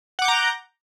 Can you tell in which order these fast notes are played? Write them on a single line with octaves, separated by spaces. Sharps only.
F#5 D6 G6 A#5